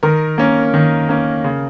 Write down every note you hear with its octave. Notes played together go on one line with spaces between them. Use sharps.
D#3 A#4
A#3 C#4
D#3
A#3 C#4
C#3